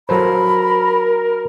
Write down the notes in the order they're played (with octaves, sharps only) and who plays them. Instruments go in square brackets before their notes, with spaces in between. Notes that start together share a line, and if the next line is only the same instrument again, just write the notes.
[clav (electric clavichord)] F#3 A4 C5 [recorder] A#4 [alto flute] B5